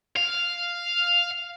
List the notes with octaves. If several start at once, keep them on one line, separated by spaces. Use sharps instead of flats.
F5